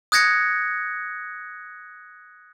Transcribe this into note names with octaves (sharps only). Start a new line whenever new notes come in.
D#6 F#6 G#6 A#6 C#7